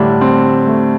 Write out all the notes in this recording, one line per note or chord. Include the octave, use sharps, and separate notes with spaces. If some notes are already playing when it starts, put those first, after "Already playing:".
Already playing: A2 D3 G3 D4
C4
A3